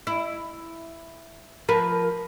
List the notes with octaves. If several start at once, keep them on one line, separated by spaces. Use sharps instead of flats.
E4
F3 A#4 B4